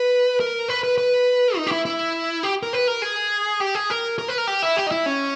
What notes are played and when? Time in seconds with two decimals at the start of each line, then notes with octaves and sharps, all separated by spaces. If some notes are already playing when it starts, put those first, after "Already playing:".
Already playing: B4
0.40 A#4
0.69 B4
0.84 B4
0.98 B4
1.57 D#4
1.67 G4
1.71 E4
1.85 E4
2.43 G4
2.63 A#4
2.73 B4
2.88 A#4
3.02 G#4
3.60 G4
3.75 G#4
3.90 A#4
4.19 A#4
4.28 B4
4.38 A#4
4.47 G4
4.62 E4
4.77 G4
4.87 D#4
4.91 E4
5.06 C#4